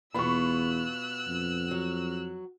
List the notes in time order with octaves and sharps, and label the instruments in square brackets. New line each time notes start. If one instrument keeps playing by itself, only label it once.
[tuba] E2 [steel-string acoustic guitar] B2 B3 F4 [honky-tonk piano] B5 C#6 [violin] E6 F#6
[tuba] F2
[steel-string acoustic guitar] F#3 F#4